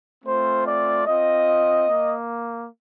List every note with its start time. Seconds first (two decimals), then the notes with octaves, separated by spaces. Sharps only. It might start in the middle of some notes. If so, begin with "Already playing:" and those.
0.24 A3 C4 F4 C5
0.65 D5
1.05 C4 F4 D#5
1.87 A#3